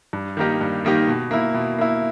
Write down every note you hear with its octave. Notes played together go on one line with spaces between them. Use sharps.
G2
D#3 A#3 D#4 G4
G2
D#3 A#3 D#4 G4
B2
A#3 E4
B2
A#3 E4